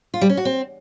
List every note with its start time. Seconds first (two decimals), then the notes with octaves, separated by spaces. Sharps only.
0.14 F4
0.22 G3
0.29 C#4
0.37 F#4
0.45 C4